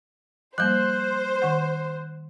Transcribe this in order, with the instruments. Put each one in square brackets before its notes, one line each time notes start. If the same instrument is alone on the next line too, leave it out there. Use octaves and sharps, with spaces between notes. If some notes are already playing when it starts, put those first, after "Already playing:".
[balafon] F3 G3 A#3 [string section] C5 [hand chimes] F#6 G6
[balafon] D#3 F#5